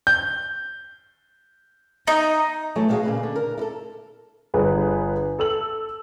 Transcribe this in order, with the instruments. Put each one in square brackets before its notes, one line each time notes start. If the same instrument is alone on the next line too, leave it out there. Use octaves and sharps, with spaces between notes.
[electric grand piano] G6
[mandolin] D#4
[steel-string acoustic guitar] E3 F#3 A3 E4
B2 D#3 G3 G#3 F#4 F5
A#2 C#3 B4
D3
A#4
E4 A4
[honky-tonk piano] G1 D3 G#4 B4
A4 E6 F#7